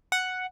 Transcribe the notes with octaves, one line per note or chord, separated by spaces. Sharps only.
F#5